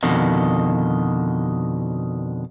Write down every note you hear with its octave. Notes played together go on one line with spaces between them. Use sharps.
F2 B2 D3 D#3